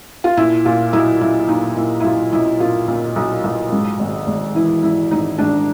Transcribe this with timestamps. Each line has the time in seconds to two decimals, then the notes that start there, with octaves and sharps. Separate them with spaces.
0.24 F4
0.37 A#2 E4
0.65 A#2 F4
0.93 B1 E4
1.21 B1 E4
1.48 A#2 D#4
1.76 A#2 E4
2.00 E4
2.04 B1 F4
2.33 B1 E4
2.60 A#2 F4
2.88 A#2
3.16 B1
3.44 B1
3.72 G#2
3.99 G#1
4.27 G#1
4.55 E3 E4
4.83 G#2 E4
5.11 G#1 D#4
5.38 G#1 D4